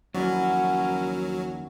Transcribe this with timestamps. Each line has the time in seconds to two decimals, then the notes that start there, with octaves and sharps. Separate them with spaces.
0.14 D#2 F3 F#3 C#4 E4 F#4 A#4 D5